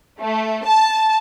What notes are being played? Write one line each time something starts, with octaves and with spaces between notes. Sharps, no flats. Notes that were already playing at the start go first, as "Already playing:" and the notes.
A3
A5